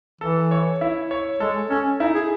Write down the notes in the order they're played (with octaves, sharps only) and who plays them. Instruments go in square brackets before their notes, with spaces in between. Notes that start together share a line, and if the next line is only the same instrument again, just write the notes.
[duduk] E3 [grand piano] A4
[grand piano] C#5
E4
C#5
[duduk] G#3 [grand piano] A4
[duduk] C#4 [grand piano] A4
[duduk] D#4 [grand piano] E4
[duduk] G#4